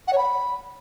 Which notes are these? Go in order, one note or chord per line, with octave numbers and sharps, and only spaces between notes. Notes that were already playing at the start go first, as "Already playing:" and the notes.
F#5
C#5
B5